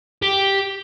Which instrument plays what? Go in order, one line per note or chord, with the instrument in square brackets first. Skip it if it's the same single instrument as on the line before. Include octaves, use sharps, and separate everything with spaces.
[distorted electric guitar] G4